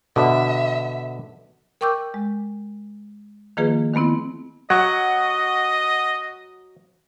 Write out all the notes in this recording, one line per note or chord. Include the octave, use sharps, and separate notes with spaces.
B2 D3 E5
A#4 G5 C#6 D6 E6 G6
G#3
D#3 F3 A#3 F4 G#4 B4
D#3 A3 B3 C4 E4
F#3 D#5 F#5 C#6